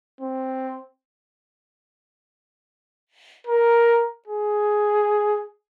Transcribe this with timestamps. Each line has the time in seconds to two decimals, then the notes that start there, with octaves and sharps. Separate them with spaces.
0.21 C4
3.47 A#4
4.27 G#4